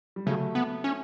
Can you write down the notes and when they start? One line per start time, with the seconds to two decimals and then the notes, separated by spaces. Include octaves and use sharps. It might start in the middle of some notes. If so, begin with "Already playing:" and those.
0.16 G3
0.26 C#3 F#3 A3
0.55 B3
0.84 C#4